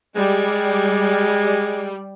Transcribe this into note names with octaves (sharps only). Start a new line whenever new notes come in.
G3 G#3